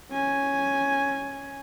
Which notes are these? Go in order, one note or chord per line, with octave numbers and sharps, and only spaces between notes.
C#4 G#5